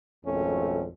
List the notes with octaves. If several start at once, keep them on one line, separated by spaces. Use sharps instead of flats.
G#1 F2 B2 A3 C#4